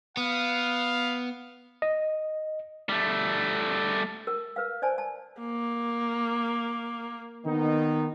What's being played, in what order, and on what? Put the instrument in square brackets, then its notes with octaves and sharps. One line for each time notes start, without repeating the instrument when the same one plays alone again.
[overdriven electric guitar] B3 [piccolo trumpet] F5
[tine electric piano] D#5
[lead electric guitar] G3 A3
[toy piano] A#4
A#4 B4 F5
C5 D5 G#5 A5
A5
[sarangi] A#3
[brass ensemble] D#3 B3 D#4